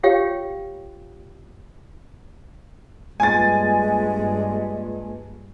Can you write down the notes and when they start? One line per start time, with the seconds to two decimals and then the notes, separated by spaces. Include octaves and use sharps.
0.03 F4 G4 C#5 F5 G5
3.20 G2 G#3 A#3 F4 B4 G#5 A6